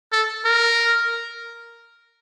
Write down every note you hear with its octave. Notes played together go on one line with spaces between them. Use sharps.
A4
A#4